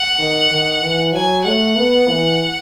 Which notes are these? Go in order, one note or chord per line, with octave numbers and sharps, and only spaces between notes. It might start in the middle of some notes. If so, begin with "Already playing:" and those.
Already playing: F#5
D#3
D#3
E3
F#3 G#5
A3 F#5
B3
E3